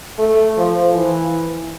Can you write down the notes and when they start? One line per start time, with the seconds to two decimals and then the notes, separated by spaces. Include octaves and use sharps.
0.18 A3
0.57 F3
0.94 E3